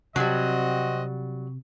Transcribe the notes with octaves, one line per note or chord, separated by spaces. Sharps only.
C3 F#3 G3 C4 F#4 D#5